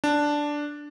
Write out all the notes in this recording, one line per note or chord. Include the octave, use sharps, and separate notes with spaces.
D4